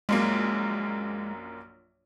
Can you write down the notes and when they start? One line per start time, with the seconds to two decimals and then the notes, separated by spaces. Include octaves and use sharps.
0.09 A#1 F#2 G#3 A#3